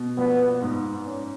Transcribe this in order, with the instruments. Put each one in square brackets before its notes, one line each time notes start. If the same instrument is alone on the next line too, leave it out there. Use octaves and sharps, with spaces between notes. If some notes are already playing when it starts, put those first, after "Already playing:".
Already playing: [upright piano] B2
[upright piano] A#1 [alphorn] B3
[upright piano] G#2
C#4